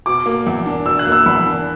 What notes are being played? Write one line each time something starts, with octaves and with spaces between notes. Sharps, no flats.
B2 D6
A#3
E2
D4
B2 E6
F#6
A#3
E6
E2 B5
D4